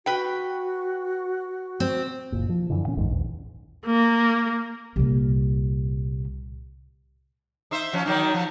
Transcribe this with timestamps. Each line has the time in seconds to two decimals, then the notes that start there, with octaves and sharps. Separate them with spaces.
0.06 F#4 B4 G5
1.80 C4
2.32 F#1 A#2
2.49 F3
2.70 F#2 D3 E3
2.85 A#2 C#4
2.97 A#1 F2 G#2 D#3
3.09 A#1 E2
3.85 A#3
4.96 C2 A#2
7.71 D#4 C5 E5
7.93 F3 C#4
8.06 D#3 F#3 D#4
8.34 F3